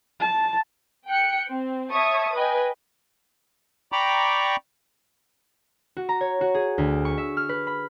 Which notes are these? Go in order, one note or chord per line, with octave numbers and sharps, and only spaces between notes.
A5
G5 F#6 C#7
C4
C#5 E5 A5 C#6 D#6
B4 D#5 G5 G#5
D5 G5 A#5 B5 C#6 D6
F#4
A#5
C#5
F#4
G#4
D2
C#6
E5
F6
B4
B5